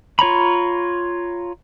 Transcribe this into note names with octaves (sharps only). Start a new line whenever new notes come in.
F4 C#5 A#5 B5